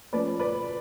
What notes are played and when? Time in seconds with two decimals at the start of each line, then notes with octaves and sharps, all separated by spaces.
0.13 F3 A3 C#4 B4 D5
0.39 B4 D5